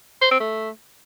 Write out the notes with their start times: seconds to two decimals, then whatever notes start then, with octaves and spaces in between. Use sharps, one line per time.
0.22 C5
0.31 C4
0.40 A3